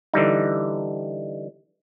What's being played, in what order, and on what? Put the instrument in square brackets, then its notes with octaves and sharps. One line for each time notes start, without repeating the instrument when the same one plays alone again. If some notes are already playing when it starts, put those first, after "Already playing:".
[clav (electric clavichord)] D3 E3 G3 D#4